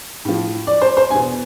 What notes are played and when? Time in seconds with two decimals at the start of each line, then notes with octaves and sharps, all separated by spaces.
0.25 A2 F3
0.67 D5
0.82 C5
0.97 C5
1.11 E2 B2 G#5